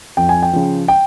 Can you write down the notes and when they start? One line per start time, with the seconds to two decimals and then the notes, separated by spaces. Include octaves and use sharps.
0.17 F2 G5
0.29 G#5
0.43 G5
0.53 C#3 F3
0.88 G5